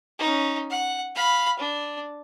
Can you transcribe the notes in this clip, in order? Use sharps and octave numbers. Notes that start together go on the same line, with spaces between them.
C#4 D#4
F#5
F5 B5
D4